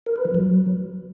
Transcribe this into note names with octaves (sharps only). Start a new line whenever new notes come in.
A#4
B4
F3
F#3